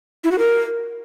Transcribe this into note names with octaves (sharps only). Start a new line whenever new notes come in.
E4
F#4
A#4